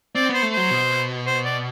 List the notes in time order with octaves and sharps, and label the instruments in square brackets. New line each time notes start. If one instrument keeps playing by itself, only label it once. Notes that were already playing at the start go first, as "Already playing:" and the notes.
[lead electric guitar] C4 [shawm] D5
[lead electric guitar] B3 [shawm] C5
[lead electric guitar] A3
[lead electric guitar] F#3 [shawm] C5
[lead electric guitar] B2
[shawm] C5
D5